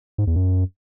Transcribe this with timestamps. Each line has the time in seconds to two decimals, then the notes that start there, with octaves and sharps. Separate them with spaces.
0.18 G#2
0.27 E2
0.36 F#2